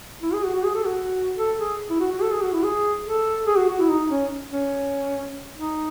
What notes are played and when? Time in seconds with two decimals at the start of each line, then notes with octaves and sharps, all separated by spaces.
0.23 E4
0.33 G#4
0.44 F#4
0.54 F#4
0.65 G#4
0.75 A4
0.85 F#4
1.37 A4
1.59 G#4
1.90 E4
2.00 F#4
2.11 F#4
2.22 A4
2.32 G#4
2.42 F#4
2.53 E4
2.63 G#4
3.06 A4
3.47 G#4
3.57 F#4
3.69 F#4
3.79 E4
3.89 D#4
4.11 C#4
4.52 C#4
5.57 D#4